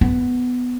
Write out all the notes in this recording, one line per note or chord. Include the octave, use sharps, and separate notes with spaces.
B3